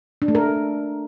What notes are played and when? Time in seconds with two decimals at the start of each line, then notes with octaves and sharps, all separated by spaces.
0.22 D4
0.28 A3
0.35 A#4